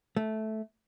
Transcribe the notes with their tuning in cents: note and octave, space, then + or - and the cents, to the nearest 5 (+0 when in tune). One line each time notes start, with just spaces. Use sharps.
A3 -10